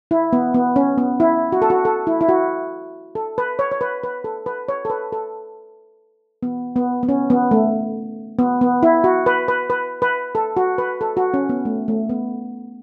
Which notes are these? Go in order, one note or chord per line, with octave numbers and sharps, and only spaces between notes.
E4
B3
B3
C#4
B3
E4
F#4
A4
F#4
A4
E4
E4
F#4
A4
B4
C#5
C#5
B4
B4
A4
B4
C#5
A4
B4
A4
B3
B3
B3
C#4
B3
A3
B3
B3
E4
F#4
B4
B4
B4
B4
A4
F#4
B4
A4
F#4
C#4
B3
A3
A3
B3